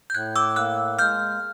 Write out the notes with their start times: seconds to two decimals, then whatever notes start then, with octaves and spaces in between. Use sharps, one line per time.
0.10 G6
0.15 A2 F#6 G#6
0.36 D6 E6
0.56 A#3 E6 F#6
0.99 G#3 F6 G6